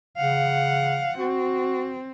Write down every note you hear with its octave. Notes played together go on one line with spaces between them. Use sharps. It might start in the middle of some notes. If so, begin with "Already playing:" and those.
C#3 F5 F#5
C4 F#4